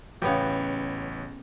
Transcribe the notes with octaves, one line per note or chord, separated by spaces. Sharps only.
A1 C#3 B3 G4 B4 C#5